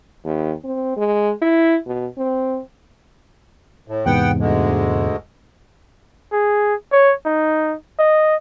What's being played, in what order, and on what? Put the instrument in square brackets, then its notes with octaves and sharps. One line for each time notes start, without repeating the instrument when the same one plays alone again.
[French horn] D#2
C4
G#3
E4
B2
C4
[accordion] A2
[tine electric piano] E2 G#2 C3 [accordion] B3 F#5 G5
[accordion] D2 D3 G#3
[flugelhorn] G#4
C#5
D#4
D#5